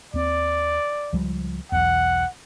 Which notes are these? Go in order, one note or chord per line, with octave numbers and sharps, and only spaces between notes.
D#2 C4 D5
C#2 F3 G3
B1 E2 F#5